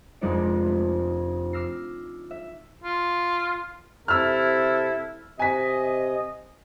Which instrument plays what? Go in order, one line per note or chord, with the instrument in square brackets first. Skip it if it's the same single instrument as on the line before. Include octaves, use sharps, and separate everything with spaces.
[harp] F1 F2 G#3 D4 D#4 D5
A3
D6 E6 F6 A#6 C7
E5
[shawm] F4
[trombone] C3 [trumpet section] E4 A4 [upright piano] E6 F6
[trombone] C3 [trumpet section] D#5 [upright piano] G#5 B6